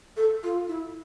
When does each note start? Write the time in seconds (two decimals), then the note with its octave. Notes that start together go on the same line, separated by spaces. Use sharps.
0.17 A4
0.43 F4
0.68 E4